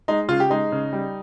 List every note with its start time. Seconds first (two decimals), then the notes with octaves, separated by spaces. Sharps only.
0.08 G#3 D#4
0.28 C#3 F4
0.40 G4
0.50 G#3 D#4
0.72 C#3
0.93 G3